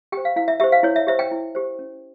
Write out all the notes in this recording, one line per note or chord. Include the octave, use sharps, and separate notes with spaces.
G4 C5 G5
F5
E4 F5
E5
G4 C5 E5
F5
E4 C#5
E5
G4 C5 E5
G5
E4
G4 C5
C#4